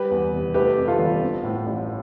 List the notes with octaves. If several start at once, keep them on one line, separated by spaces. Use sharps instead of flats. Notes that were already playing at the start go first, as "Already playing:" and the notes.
Already playing: G3 G4 B4
E2
F1
A3 G4 B4
F2
F4 A4
G1
C4
A2
A1